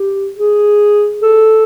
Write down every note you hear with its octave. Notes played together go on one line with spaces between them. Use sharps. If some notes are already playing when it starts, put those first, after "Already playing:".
Already playing: G4
G#4
A4